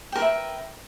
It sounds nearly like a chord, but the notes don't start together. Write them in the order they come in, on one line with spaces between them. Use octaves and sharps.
G5 A#4 B4 E5